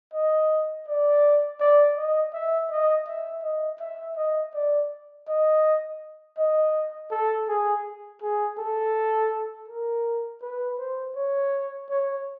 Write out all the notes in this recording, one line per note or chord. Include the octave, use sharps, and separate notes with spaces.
D#5
D5
D5
D#5
E5
D#5
E5
D#5
E5
D#5
D5
D#5
D#5
A4
G#4
G#4
A4
A#4
B4
C5
C#5
C#5